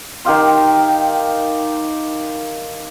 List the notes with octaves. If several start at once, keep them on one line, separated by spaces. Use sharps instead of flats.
D#3 G4 F5 C6